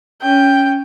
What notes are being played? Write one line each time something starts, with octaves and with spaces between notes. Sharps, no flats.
C#4 G5